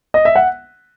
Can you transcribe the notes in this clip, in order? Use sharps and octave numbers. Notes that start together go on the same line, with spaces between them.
D#5
E5
F#5